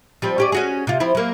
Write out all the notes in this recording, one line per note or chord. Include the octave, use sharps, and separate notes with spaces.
F3 G3 C4
C#4 G4 D5
C#4 F#4 G#4
C3 F4
F3 C4 E4
F#3 A#3